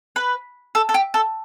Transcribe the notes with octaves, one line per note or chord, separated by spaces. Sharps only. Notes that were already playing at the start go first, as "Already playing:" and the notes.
B4
A4
A4
G4
A4